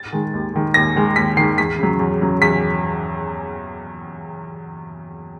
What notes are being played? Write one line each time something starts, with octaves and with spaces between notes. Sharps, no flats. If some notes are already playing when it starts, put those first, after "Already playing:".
Already playing: A6
D#3 G#3
D#2
D#3 G#3
D#2 A#6
D#3 G#3
D#2 B6
D#3 G#3 C7
E2 B6
C#3 F#3
E2
C#3 F#3
E2 B6